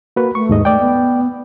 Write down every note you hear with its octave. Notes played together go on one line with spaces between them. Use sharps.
A#3 F#4 B4
A3 C#6
D#2 G#2 D#5
A3 D5 G5
B3